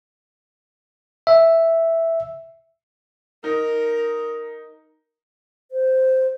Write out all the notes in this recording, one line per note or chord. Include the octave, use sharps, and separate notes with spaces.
E5
D#4 A#4
C5